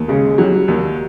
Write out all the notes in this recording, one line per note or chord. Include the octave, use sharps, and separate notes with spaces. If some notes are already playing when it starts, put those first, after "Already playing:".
Already playing: D#2
C#3 G#3
F#3 G3
D#2